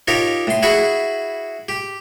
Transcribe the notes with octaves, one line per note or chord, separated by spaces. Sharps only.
D#4 F4 G4 A#4 C#5
A2 C6
E4 F#4 G#4 B5 C#6
G4